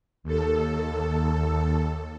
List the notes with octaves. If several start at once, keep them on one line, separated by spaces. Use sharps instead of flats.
D#2 A4